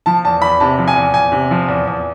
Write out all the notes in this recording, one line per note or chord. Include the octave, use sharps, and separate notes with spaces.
F3 A5
E2 A5
E2 B5
C3 A5
F3
G#5
E2
E2 G#5
C3
F3
E2
E2